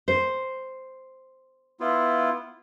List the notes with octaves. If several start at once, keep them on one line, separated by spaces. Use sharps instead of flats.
C5
B3 E4 F4